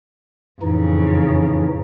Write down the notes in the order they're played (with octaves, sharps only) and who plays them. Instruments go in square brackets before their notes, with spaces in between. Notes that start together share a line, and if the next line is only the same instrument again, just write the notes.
[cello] F2 C#3 [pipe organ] A2 E3 D#4